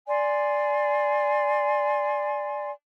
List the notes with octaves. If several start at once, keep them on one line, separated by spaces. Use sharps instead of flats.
D5 G#5 C6